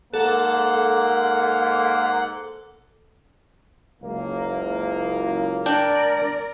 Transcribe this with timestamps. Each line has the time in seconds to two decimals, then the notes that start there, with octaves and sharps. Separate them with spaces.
0.14 G#2 A#3 A4 A#4 F#5
4.02 F#1 C#2 A#3
5.66 D4 A#4 D5 G5